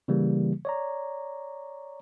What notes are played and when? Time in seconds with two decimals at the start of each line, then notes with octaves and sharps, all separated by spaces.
0.08 C#3 E3 G3 A#3
0.65 C#5 D5 A#5